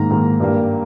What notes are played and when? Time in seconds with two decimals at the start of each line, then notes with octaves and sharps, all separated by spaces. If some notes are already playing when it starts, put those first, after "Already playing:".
Already playing: G#2 D#3 A#3 A#5
0.10 G#2 D#3 A#3
0.40 G2 G3 A#3